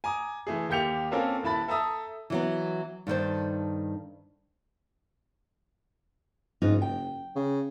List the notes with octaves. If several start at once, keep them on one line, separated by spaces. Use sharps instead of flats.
G#5 A#5 D6 D#6
E3 A3 G#4
D#2 A#3 G4 G6 C#7 F7
A#3 C4 C#4 F4 A4 A#4
D#1 E4 A5 B5 A6
A4 E5 A5 A#5 D#6 E6
E3 F#3 B3
G2 D#3 A4 C5
F#1 G#2 D#4 F4
G5
C#3